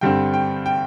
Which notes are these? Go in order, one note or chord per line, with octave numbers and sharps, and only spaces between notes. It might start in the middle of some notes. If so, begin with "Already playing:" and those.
G2 D3 G3 C4 G5
G5
G5